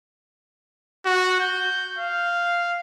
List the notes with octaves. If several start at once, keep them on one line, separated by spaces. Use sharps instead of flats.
F#4
G6
F5